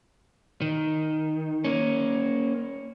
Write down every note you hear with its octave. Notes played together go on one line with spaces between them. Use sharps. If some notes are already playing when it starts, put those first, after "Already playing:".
D#3
A#3 C#4